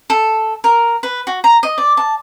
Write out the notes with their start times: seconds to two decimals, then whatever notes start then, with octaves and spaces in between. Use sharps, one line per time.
0.10 A4
0.64 A#4
1.03 B4
1.27 F#4
1.44 A#5
1.63 D#5
1.78 D5
1.97 A5